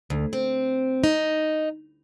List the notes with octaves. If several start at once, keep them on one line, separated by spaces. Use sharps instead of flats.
D2
C4
D#4